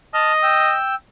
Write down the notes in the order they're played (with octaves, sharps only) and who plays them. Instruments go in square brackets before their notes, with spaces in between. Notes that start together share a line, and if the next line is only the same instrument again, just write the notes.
[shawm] D#5 [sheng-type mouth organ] A5 F6
[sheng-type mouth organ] G5 E6